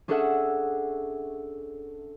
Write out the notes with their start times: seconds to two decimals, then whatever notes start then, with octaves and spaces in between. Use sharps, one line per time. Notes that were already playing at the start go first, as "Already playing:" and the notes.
0.08 C#4 D4 G#4 A4 E5 F#5